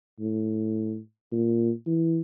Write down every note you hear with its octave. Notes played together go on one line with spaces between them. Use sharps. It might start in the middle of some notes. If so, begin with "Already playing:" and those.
A2
A#2
E3